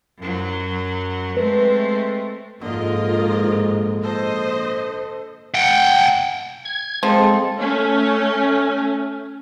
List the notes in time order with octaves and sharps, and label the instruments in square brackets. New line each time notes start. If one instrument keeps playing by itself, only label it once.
[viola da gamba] F#2 F#3
[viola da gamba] G#3 A3 C4 [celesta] B4
[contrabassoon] A#1 [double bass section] G#2 [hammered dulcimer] D3 [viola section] F4 A#4 D#5
[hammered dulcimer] A4 [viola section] C5 D#5
[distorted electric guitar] F#5 G5
[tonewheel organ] G#6
[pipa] F3 [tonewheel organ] G#3 [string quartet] C4 A4
[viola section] A3 C#4